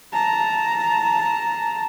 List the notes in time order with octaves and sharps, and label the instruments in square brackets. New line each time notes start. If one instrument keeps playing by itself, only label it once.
[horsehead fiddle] A5 A#5